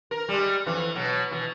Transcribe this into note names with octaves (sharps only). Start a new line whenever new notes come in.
A#4
G3 G#3
F2 E3
B2 F#3
B2 E3